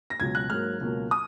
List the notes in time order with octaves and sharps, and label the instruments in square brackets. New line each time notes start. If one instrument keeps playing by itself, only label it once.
[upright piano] A#6
C#2 B2 F#3 G#6
F#6
G#2 F#3 A#3 F6
C#2 B2 F#3 A#3
D#6